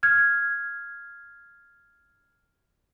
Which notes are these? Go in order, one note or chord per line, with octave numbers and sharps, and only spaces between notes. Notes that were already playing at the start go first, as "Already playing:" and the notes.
F6 G#6